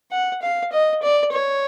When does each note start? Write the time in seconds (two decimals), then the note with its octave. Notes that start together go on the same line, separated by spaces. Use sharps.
0.12 F#5
0.42 F5
0.72 D#5
1.02 D5
1.32 C#5